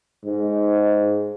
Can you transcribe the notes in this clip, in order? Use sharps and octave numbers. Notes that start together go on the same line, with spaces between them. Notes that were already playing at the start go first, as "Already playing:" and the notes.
G#2